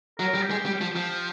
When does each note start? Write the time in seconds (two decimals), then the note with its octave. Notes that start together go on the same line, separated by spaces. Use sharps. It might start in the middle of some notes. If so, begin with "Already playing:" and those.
0.19 F#3 A#4
0.35 G3
0.42 G4
0.50 G#3
0.65 G3 G4
0.81 F3
0.96 F3